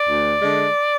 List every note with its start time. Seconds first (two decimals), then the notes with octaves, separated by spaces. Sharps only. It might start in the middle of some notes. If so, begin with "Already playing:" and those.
Already playing: D5
0.09 D2
0.42 D3 G#3